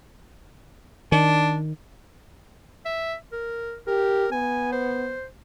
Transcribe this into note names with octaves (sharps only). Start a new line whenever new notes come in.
D#3 D4
E5
A#4
G4 A#4
B3 G#5
C5